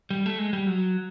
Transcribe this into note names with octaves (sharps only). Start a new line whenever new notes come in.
G3
A3
G#3
G3
F#3